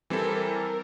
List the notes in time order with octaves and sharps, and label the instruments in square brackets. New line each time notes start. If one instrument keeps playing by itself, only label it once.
[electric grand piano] E3 G3 C4 E4 A4 [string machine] A#4